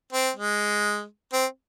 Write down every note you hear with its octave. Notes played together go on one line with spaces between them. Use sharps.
C4
G#3
C4